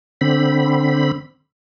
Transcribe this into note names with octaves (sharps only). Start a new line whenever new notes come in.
D3 C4 B5